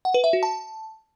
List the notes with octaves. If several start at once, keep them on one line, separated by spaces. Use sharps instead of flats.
F#5
B4
E5
F#4
A5